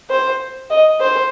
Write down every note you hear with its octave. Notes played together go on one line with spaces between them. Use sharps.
C5
D#5
C5